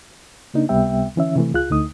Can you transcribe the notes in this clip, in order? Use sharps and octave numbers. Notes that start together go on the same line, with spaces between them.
C#3 A#3 D4 D#4
C#2 C3 G3 B3 E5 G5
D3 E3 C#4 E5
C3 E3 A3
C#2 F4 G#4 F#6
D2 D3 A3 D#4 D#6